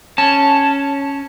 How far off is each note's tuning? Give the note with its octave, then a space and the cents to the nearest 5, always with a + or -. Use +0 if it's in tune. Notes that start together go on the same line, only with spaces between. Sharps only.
C#4 +0 A5 +0